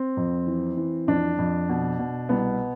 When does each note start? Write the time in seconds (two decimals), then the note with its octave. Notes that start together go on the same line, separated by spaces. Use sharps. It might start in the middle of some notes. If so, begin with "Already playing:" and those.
Already playing: C4
0.17 F2
0.47 E3
0.77 E3
1.07 F2 D4
1.38 F2
1.69 B2
1.99 B2
2.29 C2 B3